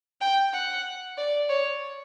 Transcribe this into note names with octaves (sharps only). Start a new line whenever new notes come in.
G5
F#5
D5
C#5